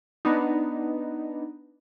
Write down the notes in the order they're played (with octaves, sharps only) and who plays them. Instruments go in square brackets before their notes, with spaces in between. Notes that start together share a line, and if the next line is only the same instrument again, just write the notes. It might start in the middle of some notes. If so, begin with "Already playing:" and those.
[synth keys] B3 D4 D#4